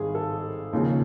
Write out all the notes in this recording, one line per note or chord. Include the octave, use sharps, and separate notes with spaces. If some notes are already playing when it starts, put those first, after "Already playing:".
Already playing: G#1 G#2 D#3 G3 G#4
A4
E1 D#2 C#3 F3